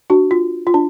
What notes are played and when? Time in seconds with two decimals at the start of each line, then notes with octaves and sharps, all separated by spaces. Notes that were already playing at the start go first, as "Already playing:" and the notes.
0.10 D4 F#4
0.31 F4
0.67 F4
0.74 D4